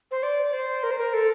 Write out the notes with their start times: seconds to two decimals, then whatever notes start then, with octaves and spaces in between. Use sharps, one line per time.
0.11 C5
0.23 D5
0.53 C5
0.83 A#4
0.91 C5
0.98 A#4
1.14 A4